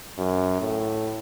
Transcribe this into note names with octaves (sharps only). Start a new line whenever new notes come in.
F#2
A2